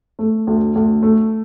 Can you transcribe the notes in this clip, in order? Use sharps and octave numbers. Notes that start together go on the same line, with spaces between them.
A3
D2
D2
A3